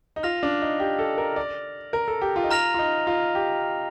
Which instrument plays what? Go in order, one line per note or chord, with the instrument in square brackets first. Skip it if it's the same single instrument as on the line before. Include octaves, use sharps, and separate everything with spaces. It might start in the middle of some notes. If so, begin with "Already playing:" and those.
[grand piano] D#4
[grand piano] F4 [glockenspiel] F6 A#6 F7
[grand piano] D4
D#4
G4
A4
A#4
D5
A#4
A4
G4
F4
D#4
[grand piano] F4 [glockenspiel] A#5 F6 A#6 F7
[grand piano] F4
D#4
F4
G4